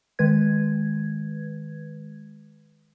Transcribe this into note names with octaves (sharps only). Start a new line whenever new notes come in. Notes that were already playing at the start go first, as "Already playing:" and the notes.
D#3 G#3 B4 G#6